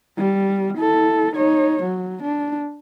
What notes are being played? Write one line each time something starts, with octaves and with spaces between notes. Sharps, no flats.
G3
E4 A4
D#4 C#5
F#3
D4